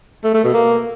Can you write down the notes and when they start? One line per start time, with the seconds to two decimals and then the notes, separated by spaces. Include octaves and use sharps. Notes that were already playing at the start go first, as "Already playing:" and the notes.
0.24 A3
0.34 A3
0.44 B2
0.54 A#3